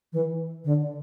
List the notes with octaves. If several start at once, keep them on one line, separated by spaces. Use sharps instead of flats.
E3
D3